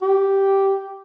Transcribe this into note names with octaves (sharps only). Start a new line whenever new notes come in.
G4